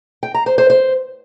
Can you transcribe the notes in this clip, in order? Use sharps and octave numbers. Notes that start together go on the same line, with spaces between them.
G5
A#5
C5
C5
C5